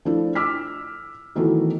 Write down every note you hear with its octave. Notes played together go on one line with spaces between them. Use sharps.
F3 A3 D4 E4
D6 E6 F6 B6
D#3 E3 F#3 A3 B3